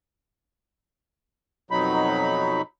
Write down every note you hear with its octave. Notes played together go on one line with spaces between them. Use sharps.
F2 B2 F#3 D#4 B5